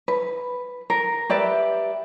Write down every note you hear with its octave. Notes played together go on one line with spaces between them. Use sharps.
B4
A#4
G4 B4 D5 E5